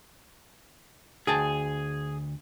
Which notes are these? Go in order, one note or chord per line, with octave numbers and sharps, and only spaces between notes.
D2 G#4 G5 A5